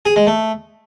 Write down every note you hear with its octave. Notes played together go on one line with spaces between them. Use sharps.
G#4
G#3
A3